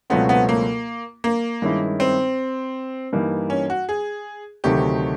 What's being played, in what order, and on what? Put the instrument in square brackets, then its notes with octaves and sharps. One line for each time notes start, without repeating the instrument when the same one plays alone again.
[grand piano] C#2 B2 F#3 A3 C4 [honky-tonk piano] B3
[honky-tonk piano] B3
A#3
A#3
[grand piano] G2 D#3 G#3 C#4 E4
[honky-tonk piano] C4
[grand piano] G2 E3 G3 A#3 D#4
[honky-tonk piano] C#4
F#4
G#4
[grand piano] D2 C3 D#3 F#3 A3 [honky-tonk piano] G4